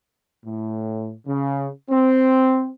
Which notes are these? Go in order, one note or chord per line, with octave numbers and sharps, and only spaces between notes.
A2
C#3
C4